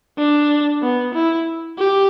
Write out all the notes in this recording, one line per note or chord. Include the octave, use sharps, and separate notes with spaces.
D4
B3
E4
G4